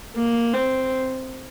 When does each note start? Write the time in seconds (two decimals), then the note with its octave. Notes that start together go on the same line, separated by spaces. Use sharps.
0.16 A#3
0.54 C4